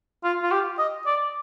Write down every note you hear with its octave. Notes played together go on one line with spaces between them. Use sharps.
F4
F4
G4
D#5
D5